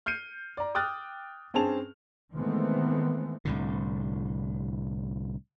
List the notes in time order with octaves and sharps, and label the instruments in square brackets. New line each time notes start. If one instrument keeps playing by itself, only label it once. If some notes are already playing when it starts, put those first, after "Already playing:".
[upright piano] F6 G6 C7 C#7 D#7
D5 A#5
G5 D6 D#6 F6 F#6 A6
G2 C4 C#4 G#4 A5 F7
[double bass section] D#3 E3 G#3 A3 B3 C4
[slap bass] C2 A2 D3